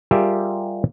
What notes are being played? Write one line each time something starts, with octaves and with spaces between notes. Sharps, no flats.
G3 F4 G4 G#4 A#4 E5